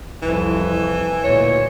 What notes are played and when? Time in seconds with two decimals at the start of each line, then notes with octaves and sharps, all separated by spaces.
0.22 C2 F2 E3
1.24 D2 A#2 C#5